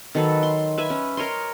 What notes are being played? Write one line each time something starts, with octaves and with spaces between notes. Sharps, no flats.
D#3 F#3 A4 B4
C6
B4 E5 G#5
C#4
A#4 C#5 D#5 C6